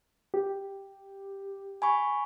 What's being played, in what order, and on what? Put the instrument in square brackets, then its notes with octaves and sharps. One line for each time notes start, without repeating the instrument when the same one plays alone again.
[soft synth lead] G4
[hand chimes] G#5 B5 C#6